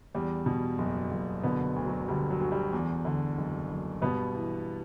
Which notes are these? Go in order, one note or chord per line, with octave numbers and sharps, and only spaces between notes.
E2 G3
B2
F#1
F#1
B2 D3 B3
D2
F#3
D3 G3
F#3
D2
G3
E2
D3
F#1
F#1
G2 B2 B3
E3